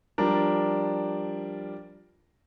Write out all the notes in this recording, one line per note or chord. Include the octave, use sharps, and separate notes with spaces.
F3 G3 D4 A#4